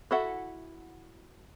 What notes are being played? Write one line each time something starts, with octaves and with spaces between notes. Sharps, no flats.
E4 F#4 A4 E5 F#5